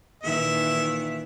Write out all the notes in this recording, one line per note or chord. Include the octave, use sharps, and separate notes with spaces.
A#2 D#3 E3 E5